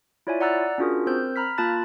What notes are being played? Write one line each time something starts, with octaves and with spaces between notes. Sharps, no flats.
E4 F4 C#5 D5 E5 G#5
D5 F#5 A#5 E6 F#6 A6
C#4 D4 F4 F#4 G#4 A#4
C4 A#4 C5 E6 G6
A#5 B5 F6 B6
A#3 F4 A5 B5 F#6 A6